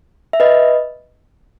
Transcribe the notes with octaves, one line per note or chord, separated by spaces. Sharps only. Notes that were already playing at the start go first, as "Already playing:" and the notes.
E5
B4 D#5